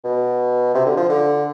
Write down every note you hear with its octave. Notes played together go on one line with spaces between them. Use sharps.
B2
C3
D3
F3
D3